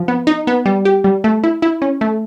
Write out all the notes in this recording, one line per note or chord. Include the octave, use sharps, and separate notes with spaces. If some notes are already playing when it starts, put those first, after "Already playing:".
Already playing: F3
B3
D#4
B3
G3
G4
G3
A3
E4
E4
C#4
A3